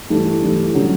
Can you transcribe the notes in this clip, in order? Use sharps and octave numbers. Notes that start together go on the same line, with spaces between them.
G2 E3 A3
G2 E3 A3
D3 F#3 A3 C#4